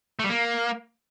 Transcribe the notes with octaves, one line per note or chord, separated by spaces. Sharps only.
A3
G3
A#3